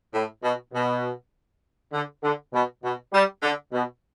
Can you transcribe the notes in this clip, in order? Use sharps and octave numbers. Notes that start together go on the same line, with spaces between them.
A2
B2
B2
D3
D3
B2
B2
G3
D3
B2